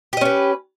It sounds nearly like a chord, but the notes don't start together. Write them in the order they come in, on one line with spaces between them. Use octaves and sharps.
G4 D#5 C#4 B4